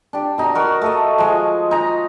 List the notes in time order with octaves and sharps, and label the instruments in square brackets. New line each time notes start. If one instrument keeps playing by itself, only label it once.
[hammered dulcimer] D4 G4
B2 D#4 A#5
F#4 A#4 C#5
A3 A4 D#5
F3 G#3
D#4 A#5